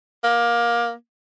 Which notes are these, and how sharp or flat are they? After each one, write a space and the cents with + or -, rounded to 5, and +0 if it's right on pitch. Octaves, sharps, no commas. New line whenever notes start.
A#3 +20